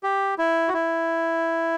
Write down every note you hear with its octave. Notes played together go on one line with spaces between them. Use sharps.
G4
E4
F#4
E4